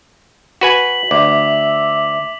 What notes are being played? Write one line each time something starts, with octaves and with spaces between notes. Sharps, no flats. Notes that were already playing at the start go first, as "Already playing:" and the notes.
F#4 B4 G#5 B6 F#7
D2 E5 D6